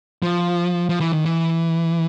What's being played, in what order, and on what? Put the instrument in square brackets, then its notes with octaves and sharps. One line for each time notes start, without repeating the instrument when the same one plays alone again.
[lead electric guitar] F3
F3
E3
D#3
E3